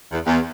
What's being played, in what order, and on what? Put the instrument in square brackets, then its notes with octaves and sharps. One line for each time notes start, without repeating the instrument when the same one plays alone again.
[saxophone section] E2
E2